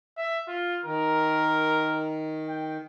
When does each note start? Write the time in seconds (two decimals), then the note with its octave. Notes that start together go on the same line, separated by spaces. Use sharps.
0.17 E5
0.48 F4
0.85 D#3 A#4
2.49 G5